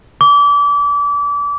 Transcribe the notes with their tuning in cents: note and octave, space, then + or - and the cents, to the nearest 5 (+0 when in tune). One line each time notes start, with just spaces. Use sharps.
D6 -30